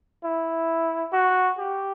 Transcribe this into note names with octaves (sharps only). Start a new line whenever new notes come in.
E4
F#4
G4